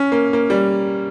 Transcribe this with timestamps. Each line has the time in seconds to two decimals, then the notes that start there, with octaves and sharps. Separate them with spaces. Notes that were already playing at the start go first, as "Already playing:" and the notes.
Already playing: C#4
0.12 A#3
0.33 A#3
0.50 G3